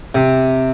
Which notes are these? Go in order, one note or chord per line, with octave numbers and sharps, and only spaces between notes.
C3